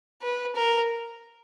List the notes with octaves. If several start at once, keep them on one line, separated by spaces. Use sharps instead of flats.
B4
A#4